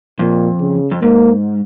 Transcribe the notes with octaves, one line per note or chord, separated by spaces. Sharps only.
F2 A#2
C#3
F2
G#2 A#3